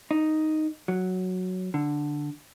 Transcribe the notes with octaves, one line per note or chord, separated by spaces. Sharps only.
D#4
F#3
D3